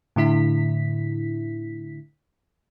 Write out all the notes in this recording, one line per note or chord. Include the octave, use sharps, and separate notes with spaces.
A2 D3 E4 B6